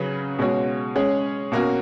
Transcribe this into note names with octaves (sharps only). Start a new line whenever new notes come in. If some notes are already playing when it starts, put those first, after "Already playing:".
Already playing: C#3 F#3 C#4 G#4 B4
B2 G#3 C#4 F#4 C#5
G#3 C#4 G#4 C#5
B2 A#3 C#4 F#4